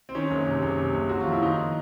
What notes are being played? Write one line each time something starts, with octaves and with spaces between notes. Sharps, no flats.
C4
D#3 C#4
F#1
C3
F#1
C3
F#1
F#1 F#4
F4
F2
E4
D#3 D#4